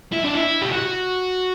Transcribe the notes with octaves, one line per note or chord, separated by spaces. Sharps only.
E4
D4
E4
G4
F#4